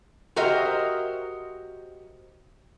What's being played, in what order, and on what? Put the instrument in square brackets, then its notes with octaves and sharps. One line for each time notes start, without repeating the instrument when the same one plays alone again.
[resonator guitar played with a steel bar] F#4 G4 A#4 C5 D#5 E5